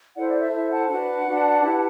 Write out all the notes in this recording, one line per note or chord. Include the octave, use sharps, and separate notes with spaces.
E4 A4 C5 D5 F#5
D5
E5
E4 A4 C5 E5
F#5 A5
D4 F#4 B4 F#5 A5
D4 F#4 B4
E4 G4 B4